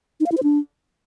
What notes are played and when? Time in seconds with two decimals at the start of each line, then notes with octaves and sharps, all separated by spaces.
0.20 D#4
0.26 F5
0.32 E4
0.37 C5
0.43 D4